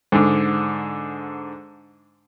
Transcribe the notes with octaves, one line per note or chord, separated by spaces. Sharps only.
G#2 D3